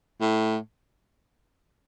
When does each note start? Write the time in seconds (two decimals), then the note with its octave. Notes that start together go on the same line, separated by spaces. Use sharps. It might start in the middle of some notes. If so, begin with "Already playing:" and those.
0.20 A2